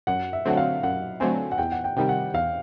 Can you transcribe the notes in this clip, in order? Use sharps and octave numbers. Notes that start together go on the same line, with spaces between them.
F#2 F#5
E5
D3 F#3 A3 C4 F#5
F5
F#2 F#5
D3 F#3 A3 C4 G#5
F#5
E2 G5
F#5
G5
C3 D#3 G3 G5
F#5
E2 F5